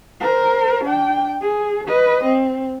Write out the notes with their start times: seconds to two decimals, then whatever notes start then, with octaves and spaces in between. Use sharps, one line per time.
0.21 A#4 C5
0.85 D4 G5
1.41 G#4
1.88 B4 D#5
2.24 C4